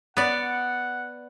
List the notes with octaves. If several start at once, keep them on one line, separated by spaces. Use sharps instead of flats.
B3 D5 F#5